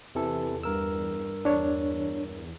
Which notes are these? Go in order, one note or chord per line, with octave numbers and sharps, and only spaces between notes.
E2 C3 E3 A4
G2 A#4 E6
E2 D4 C#5